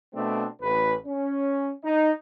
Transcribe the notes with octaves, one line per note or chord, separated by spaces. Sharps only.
B2 A3 C4 D4
A1 B4
C#4
D#4